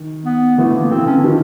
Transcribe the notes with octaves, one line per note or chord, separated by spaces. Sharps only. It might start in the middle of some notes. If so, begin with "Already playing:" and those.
Already playing: D#3
B3
D3 E3 A3
A#3
D3 E3 C4
C#4
D4
D#3 F3